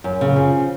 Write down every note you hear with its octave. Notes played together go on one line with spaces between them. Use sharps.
F#2
C#3
F3